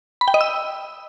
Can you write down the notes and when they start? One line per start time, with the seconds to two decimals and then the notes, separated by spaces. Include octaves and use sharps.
0.21 B5
0.28 G5
0.34 D#5
0.41 E6